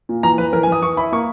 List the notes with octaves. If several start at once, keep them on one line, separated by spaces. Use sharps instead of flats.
A#2
E3 A#5
E3 B4
E3 A#4
G#5
E3 D#6
E3 C#6
E4 B5
A#3 C#6